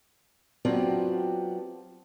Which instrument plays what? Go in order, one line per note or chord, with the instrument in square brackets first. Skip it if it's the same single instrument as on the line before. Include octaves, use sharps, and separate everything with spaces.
[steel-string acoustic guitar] F#3 B3 C4 D4 F4 G4